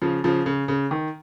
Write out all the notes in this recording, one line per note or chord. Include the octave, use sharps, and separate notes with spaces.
C#3 F3
C#3 F3
C#3
C#3
D#3